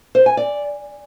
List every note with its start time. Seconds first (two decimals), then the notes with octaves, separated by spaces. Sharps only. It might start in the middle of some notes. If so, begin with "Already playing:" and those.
0.15 C5
0.26 G#5
0.37 D5